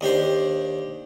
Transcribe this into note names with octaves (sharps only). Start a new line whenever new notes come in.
D#2 D4 G4 C5